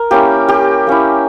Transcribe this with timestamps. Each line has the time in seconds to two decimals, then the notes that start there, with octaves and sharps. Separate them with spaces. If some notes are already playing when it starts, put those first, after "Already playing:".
Already playing: A#4
0.11 A#3 C#4 E4 G4
0.48 G4
0.87 A#3 C#4 E4